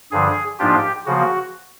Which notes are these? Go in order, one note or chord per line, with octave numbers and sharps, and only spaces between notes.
G2 D3 F3 G#4
G#2 F3 A#3 D4 F4 G4
C#3 F3 A#3 F#4